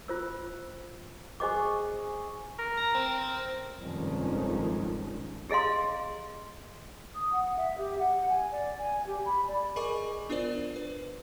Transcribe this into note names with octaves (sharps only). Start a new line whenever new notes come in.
F4 C5 E6
G#4 C5 D#5 C#6 D6 E6
A#4
A#5
C4
F1 G2 D#3 F3 G#3 C#4
G4 G#4 D#5 F5 C6
D#6
F#5
E5
G4
F#5
G#5
D5
G#5
G4
B5
D5
G#4 A#4 D#5 G#5 C#6 D6
B3 D4 F4 A#4 C5 D5
B4